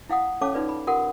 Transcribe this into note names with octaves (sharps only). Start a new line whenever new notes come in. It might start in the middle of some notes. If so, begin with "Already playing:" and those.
E4 F5 F#5 D#6
C#4 A4 C#5 F5 A5 D6
D#4 F4 B4 D5
B5
F4 G4 A#4 F#5 D#6